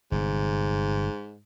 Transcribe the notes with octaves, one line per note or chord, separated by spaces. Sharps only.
G1 G#2 C3